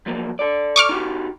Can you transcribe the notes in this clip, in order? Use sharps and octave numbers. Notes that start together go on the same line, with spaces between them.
F3 F#3 A#3
A4 D5
C#6 D6 F6
D#4 F#4 G4